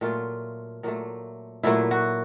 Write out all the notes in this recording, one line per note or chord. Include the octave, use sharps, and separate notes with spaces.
A#2 F#3 A3 F4
A#2 F#3 A3
A#2 F#3 A3 E4
F#4